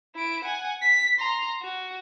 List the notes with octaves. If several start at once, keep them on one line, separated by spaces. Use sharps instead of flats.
E4 D7
F#5 G#5
B6
A#5 C6
F#4